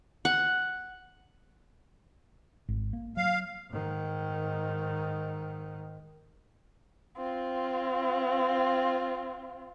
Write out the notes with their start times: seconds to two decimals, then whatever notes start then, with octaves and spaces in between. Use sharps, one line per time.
0.25 F#5
2.69 G#1
2.93 A#3
3.17 F#3 F5
3.70 G#2 D#3
7.17 C4 F4